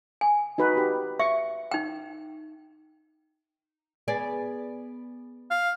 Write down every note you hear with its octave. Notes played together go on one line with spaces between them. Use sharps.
G#5
D#4 F#4 B4
G4
E5 C#6
D#4 G5
B3 G#4 D5
F5